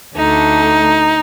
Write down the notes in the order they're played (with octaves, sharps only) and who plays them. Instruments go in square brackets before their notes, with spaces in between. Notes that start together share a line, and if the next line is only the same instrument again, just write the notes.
[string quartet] D2 D3 A3 D#4